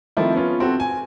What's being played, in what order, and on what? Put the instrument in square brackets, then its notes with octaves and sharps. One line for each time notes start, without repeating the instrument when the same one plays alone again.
[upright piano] D#3 F3 A3 C4 E4 F4
B3 C#4 F4
C4 F#4 A4
G#5